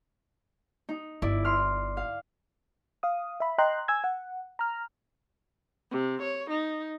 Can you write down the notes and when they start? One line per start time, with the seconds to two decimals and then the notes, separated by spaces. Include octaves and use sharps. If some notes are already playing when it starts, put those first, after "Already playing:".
0.89 D#4
1.22 G1 E4 D5
1.45 C6 F6
1.97 F5
3.03 F5 D#6
3.40 E5 B5
3.58 D#5 G5 A#5 C6 F#6
3.88 G#5 E6 G#6
4.04 F#5
4.59 A#5 F6
5.91 C3
6.21 C#5
6.50 D#4